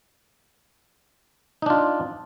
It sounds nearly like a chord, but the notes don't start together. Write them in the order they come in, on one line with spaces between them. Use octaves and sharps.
D#4 D4 F4